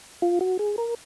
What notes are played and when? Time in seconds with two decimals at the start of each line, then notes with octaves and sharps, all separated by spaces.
0.22 F4
0.41 F#4
0.59 G#4
0.78 A#4